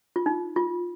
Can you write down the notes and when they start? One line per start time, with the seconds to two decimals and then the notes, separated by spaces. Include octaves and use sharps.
0.16 F4
0.26 D#4
0.56 F4